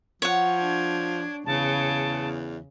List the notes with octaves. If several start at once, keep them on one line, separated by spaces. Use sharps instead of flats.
F3 C#5 F#5
D4 G#6
E2 C#3 A5